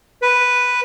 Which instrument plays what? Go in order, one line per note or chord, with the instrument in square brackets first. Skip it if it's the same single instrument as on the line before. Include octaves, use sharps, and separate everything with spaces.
[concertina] B4